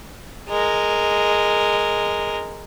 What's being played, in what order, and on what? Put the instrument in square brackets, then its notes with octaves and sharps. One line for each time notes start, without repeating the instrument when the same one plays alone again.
[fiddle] G#3 A#4